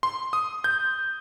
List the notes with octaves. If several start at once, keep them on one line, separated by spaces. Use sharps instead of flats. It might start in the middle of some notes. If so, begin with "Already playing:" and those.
C6
D#6
G6